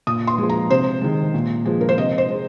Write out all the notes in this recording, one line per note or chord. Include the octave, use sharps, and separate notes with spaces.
A#2 D#6
C6
F3 G#3
A#5
C3 C5
D#3 G#3
A#2
F3 G#3
A#4
C5
C3 D#5
C5
G#3